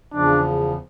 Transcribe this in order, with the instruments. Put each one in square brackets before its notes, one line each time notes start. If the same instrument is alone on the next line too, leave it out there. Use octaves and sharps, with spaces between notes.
[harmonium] E2 C#3 F3 [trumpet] D4